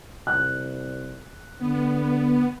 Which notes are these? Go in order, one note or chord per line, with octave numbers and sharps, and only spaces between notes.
C2 F#6
D3 B3